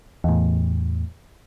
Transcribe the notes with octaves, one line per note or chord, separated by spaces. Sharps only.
E2 A2